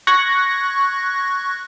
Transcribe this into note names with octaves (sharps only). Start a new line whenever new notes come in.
C#6 F#6 G#6 A#6